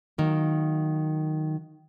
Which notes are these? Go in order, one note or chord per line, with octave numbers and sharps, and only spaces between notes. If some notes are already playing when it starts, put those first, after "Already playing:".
D#3 F#3 A#3